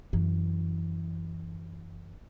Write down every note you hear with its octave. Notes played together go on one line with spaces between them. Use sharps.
F#2 E3